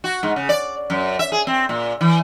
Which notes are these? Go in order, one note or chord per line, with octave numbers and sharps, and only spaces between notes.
F#4
G#2
C#3
D5
F#2
E5
G#4
C4
A#2
E3